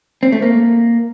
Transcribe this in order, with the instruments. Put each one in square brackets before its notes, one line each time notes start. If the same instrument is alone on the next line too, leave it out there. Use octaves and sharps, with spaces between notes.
[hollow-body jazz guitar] C4
A3
A#3